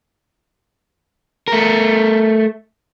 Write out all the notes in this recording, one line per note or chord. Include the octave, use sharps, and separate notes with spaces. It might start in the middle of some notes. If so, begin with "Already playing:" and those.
A3 A#4